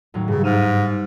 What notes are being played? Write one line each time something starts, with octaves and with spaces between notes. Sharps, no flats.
D#2 A2 F#3
G2 C#3
G#2 F6 D#7 E7